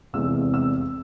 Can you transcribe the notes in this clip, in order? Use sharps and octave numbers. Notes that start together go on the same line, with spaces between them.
F1 E2 C3 E3 G#3 E6
E6